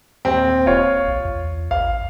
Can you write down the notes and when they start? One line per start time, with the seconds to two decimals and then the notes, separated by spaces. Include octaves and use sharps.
0.25 D#1 C4
0.66 D1 F4 C#5 F5
1.08 A#1
1.25 E2
1.71 A1 F5